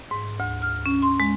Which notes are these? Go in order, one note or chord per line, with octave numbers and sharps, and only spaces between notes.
G#2
D2
F6
C#4
C6
G#3